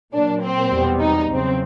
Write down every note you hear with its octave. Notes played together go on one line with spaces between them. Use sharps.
A#2 F#3 A#3 D4
C4
E2 B2 G3 B3
D#4
E2 C#3 F#3 C4